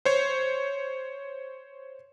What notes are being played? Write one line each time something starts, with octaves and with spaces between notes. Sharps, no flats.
C5 C#5